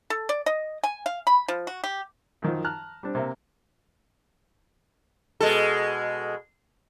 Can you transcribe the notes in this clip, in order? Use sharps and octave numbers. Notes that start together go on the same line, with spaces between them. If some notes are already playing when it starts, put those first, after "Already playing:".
A4
D5
D#5
G#5
F5
B5
F3
F#4
G4
F#2 D#3 F3
A5 A#5 F6 F#6
G3 C4 D4
C3 A#3 E5
B2 G#3 A4